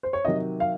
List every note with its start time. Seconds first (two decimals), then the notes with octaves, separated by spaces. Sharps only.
0.03 C5
0.13 C#5
0.25 C3 D#3 F#3 D#5
0.60 F5